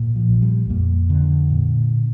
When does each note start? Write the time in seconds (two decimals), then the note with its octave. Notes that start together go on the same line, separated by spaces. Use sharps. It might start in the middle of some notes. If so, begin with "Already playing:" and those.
Already playing: A#2
0.16 F3
0.29 A#1
0.42 G3
0.70 F2 A#3
1.10 D3
1.50 A#2